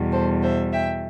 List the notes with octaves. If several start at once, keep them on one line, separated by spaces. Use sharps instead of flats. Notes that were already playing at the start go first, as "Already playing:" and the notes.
Already playing: E2 B2 G3
A4 C5
C5 E5
E5 G5